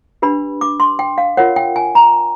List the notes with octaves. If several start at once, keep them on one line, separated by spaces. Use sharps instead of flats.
D4 G4 B4 B5
D6
C6
G5
F5
F4 A#4 C#5 F#5
G5
G#5
A#5